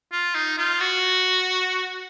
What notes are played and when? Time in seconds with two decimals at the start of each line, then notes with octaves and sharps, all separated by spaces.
0.12 F4
0.35 D#4
0.58 F4
0.80 F#4